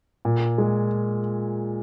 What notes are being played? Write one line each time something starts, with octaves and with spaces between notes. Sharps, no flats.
A#2
G#3